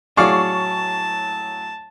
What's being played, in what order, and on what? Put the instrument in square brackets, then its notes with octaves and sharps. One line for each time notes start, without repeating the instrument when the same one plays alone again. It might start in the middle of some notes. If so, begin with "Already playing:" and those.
[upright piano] A2 F#3 [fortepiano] G#4 D5 F5 [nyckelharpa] A5 [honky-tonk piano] C#6